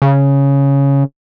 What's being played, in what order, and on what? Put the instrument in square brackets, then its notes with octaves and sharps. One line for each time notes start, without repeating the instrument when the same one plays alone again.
[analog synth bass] C#3